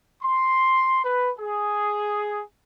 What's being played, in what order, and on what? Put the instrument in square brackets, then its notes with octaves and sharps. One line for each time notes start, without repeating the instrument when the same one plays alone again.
[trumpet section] C6
B4
G#4